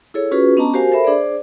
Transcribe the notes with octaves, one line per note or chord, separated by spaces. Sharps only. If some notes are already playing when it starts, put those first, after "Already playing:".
E4 G#4 A4 C#5
C#4 F4 F#4 G#4 B4
B3 C#4 D4 D#5 A5 A#5
F#4 G4 A#4 C5 F5 G#5
A4 A#4 C5 E5 B5
D4 G#4 C5 D5